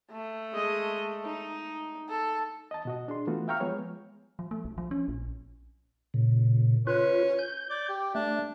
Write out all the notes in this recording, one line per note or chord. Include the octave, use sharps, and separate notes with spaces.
A3
G#3 D#5
D#4
A4
D#5 A5
B2 F#4 D#5
D4 G#4 C6
E3 A3 B3 F4 F#4
E5 F5 G5 A#5 C#6 F6
F3 G#3 B3 G#4 C#5
F3
A3
B1
F3
C#4
A#1
A#2 C#3
C#4 F4 B4
G6
D5
G4
A3 D4